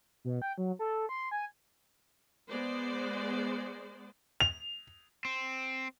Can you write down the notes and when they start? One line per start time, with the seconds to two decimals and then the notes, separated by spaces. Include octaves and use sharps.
0.25 B2
0.42 G5
0.58 F#3
0.79 A4
1.09 C6
1.31 G#5
2.50 G#3 B3 C5 D5
4.40 F7
5.25 C4